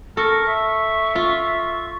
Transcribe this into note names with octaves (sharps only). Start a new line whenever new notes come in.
A4 A#4 C#6
E5
F4